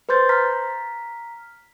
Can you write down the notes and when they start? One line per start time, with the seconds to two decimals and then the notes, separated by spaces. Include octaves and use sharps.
0.09 B4 C5 C6 G6 A6
0.29 A#5 F6 B6